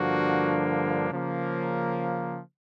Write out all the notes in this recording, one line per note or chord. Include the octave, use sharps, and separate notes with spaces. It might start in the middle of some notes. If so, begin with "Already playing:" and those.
Already playing: G2 D3 F3 A#3 D4 F#4
C#3 F3 A#3